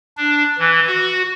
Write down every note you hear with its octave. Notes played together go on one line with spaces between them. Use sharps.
D4
E3
F#4